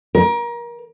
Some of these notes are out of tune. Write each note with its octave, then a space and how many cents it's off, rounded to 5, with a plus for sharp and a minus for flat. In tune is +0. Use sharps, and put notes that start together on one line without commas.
A#4 +30